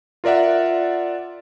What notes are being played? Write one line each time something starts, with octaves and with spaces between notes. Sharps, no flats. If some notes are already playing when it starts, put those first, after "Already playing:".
F4 A#4 D5 E5 F#5